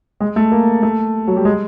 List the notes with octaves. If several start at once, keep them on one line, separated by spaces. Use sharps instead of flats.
G#3
A3
A#3
A3
F#3
G3
G#3